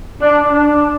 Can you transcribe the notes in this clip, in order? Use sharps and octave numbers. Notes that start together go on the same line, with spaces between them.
D4
D4